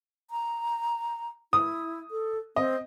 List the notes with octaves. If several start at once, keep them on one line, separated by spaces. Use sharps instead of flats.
A#5
E4 D#6
A4
C4 D#5